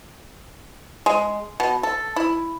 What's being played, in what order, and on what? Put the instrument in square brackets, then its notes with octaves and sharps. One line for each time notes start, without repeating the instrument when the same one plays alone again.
[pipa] G#3
B2
A4
E4